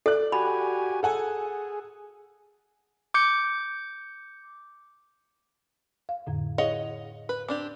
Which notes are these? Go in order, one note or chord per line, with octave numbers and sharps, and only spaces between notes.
A4 D5 F#6
F#4 G4 G#5 B5
G#4 A4 F#5 G#5
D6 G6 C#7
F5
F2 A2 D3
E4 G#4 C#5 D#5 F5 F#5
B4
C4 D4 G4 D6